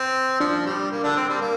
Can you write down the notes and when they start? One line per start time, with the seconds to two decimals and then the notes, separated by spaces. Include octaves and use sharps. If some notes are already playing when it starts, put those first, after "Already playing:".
Already playing: C4
0.40 F3 D4
0.66 G3
0.91 A#3
1.03 D3 D4
1.16 C4
1.29 G3
1.41 A#3